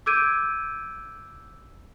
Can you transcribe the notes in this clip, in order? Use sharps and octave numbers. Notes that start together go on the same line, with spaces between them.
D6 E6 G6 G#6 D7 D#7